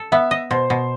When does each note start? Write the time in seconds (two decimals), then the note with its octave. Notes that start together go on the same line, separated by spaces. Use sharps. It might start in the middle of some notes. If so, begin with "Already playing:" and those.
Already playing: A4
0.12 B3 E5
0.31 D#5
0.51 B2 C5
0.70 B2